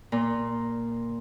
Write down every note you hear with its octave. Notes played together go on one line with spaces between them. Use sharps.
A#2